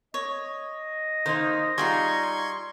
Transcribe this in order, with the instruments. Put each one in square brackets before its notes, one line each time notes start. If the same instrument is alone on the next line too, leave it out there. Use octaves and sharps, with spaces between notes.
[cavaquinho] C#5 [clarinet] D#5
[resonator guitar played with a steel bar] D#3 A#3 D#4 [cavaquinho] C5
[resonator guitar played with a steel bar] G3 [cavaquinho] D#4 F4 G#4 [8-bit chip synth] C6 C#6 G#6